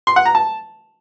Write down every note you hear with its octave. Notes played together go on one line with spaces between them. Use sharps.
C6
F#5
A#5
A5